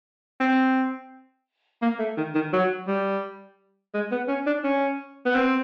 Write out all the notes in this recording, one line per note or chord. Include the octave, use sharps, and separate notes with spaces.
C4
A#3
A3
D#3
D#3
F#3
G3
G#3
B3
C#4
D4
C#4
B3
C4